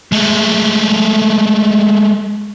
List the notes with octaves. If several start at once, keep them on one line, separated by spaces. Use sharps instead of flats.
G#3 A3